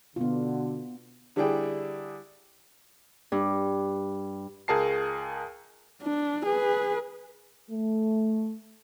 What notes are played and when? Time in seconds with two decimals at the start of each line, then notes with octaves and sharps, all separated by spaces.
0.16 B2 D3 B3 F4
1.36 D3 G3 D4 E4 G#4 G5
3.32 G2
4.68 C#2 G#4 A#4 A5 C7
6.02 D4
6.45 G#4 B4
7.70 A3